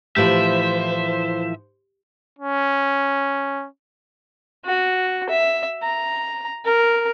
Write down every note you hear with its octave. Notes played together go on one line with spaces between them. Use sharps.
A2 E3 F3 G4 C5 E5
C#4
F#4
E5
A#5
A#4